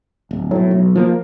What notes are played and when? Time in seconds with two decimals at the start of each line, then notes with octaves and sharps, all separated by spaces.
0.31 D1
0.51 B1 A2 F#3
0.71 B1
0.96 F3 A#3